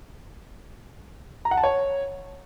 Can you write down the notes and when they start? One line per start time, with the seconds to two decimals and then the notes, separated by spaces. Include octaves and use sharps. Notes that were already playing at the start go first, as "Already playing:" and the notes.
1.45 A#5
1.51 F#5
1.57 A5
1.64 C#5